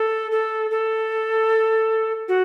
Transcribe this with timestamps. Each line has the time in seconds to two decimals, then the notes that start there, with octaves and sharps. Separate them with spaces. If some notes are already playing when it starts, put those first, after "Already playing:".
Already playing: A4
0.31 A4
0.71 A4
2.28 F#4